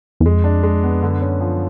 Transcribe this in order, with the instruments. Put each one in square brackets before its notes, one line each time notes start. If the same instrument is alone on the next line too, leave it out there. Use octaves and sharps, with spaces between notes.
[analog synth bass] E2
[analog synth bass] F2 [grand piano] G#3
[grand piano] D4
G#3
B3
[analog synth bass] F#2 [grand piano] D3
[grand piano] C#4
F3